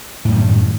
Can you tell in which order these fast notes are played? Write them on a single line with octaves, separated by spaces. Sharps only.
A2 F#2 G3 D#3